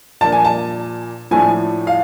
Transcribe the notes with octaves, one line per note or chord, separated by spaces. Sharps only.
A#2 F3 A#3 D4 A5
G#5
A5
A2 F3 A3 D4 G#5
F5